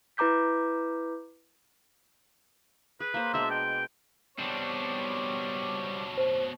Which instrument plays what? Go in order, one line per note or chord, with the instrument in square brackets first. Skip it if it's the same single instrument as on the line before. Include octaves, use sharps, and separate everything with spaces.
[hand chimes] E4 B4 A#5 D6 G6 B6
[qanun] G#4 [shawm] B4
[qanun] A#3 C5
[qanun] B2 G#3 D4 [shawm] E5
[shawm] G5
[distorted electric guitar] B2 D4 [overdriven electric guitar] G3 C4 [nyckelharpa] C#5
[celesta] C5